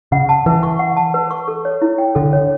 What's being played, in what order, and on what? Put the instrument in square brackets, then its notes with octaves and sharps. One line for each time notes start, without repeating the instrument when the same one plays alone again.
[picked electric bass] C#3 [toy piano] F#5
[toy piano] A5
[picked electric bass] E3 [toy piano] B4
[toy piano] C#6
F#5
A5
B4
C#6
A4
C#5
E4
G5
[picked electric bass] D3 [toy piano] A4
[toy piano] C#5